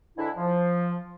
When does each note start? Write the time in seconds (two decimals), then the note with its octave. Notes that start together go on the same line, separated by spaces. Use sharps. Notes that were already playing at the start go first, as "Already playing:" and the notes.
0.17 G#2 D3 E3 D4 E4
0.37 F3